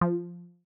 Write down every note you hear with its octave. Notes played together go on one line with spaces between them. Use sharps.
F3